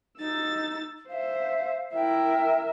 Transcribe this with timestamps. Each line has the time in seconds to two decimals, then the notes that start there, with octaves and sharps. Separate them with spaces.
0.19 D#4 E6 A6
1.09 C5 E5 F5
1.95 E4 A#4 E5 G5